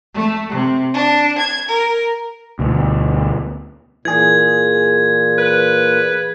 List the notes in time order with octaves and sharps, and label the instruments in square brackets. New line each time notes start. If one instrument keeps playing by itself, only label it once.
[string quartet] A3
C3
D4
G#6
A#4
[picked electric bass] D2 B2
[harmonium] A#2 [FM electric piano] E3 G#4 [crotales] G#6
[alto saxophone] B4